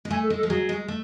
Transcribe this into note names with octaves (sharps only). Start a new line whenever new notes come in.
G#3
A3 G#5
A4
G#3
A4
F3
F#3 G#4
G#3
A3